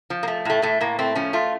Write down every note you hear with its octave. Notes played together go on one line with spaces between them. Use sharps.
F3
A#3
A3
A2 A3
A2 A3
A2 A#3
A3 C4
F3 C#4
A3 F4